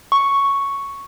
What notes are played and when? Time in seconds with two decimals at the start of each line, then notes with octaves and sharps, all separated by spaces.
0.12 C#6